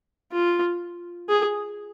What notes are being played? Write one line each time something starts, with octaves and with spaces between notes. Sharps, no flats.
F4
G#4